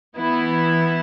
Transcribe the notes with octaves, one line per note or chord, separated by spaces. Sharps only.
E3 B3 E4